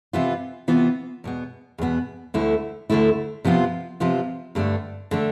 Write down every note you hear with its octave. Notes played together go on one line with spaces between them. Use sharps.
C3 E3 B3 F4
C3 E3 B3 F4
E2 B2 B3
E2 B2 B3
D2 D3 A3 E4
D2 D3 A3 E4
C3 F3 B3 F4
C3 F3 B3 F4
G2 D3 A3 D4
D3 A3 D4